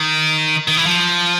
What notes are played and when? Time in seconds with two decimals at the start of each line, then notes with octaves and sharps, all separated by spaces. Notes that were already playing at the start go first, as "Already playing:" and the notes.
Already playing: D#3
0.68 D#3
0.77 E3
0.86 F3